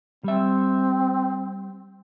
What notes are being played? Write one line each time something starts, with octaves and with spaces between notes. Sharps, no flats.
G3 C4 E5